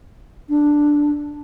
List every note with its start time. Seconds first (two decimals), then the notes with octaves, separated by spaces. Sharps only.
0.49 D4